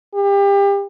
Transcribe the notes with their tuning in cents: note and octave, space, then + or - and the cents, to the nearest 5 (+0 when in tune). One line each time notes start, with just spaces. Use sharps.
G4 +30